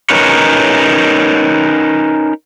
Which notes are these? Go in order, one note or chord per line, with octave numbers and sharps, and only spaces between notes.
C#4 D#4 A#4 B4 C#5